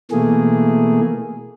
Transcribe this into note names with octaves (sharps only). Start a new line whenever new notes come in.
B2 E3 A3 A#3 G#4